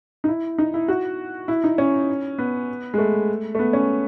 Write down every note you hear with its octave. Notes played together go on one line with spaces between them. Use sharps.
D#4
E4
D#4
E4
F#4
E4
D#4
C#4
B3
G#3
A3
A3
B3
C#4